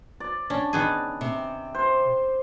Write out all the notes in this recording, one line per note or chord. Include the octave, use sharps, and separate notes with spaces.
D5
C#4 D4
D#3 B3 G#4
C3
C5